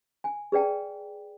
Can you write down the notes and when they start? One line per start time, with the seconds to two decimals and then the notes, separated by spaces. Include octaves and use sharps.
0.24 G#5
0.52 G#4 B4 D5 G5 A5